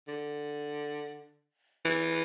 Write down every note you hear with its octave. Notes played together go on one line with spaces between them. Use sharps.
D3
E3